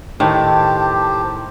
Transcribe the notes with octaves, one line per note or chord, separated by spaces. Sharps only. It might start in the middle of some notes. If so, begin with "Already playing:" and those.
A2 D#3 G4 C5 A5